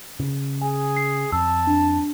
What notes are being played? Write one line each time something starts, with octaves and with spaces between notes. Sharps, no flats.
C#3
G#4 G#5
C7
F2 A5 E6
D4